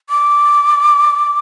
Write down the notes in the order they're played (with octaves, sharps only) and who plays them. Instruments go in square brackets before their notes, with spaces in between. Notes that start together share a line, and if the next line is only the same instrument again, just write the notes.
[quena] D6